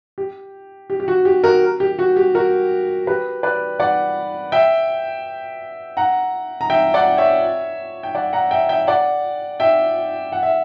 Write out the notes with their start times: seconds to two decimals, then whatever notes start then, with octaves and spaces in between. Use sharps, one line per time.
0.18 G4
0.90 G4
1.00 G4
1.08 F#4
1.25 G4
1.44 F#4 A#4
1.80 G4
1.99 F#4
2.16 G4
2.35 F#4 A#4
3.07 G4 B4
3.43 B4 D5
3.80 D5 F#5
4.52 E5 G5
5.97 F#5 A#5
6.61 A#5
6.70 E5 G5
6.94 D5 F#5
7.18 C#5 E5
8.03 G5
8.15 D5 F#5
8.33 F#5 A#5
8.51 E5 G5
8.69 E5 G5
8.87 D5 F#5
9.60 E5 G5
10.32 F#5
10.43 E5